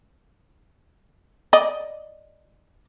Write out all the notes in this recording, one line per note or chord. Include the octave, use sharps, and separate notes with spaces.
D5 D#5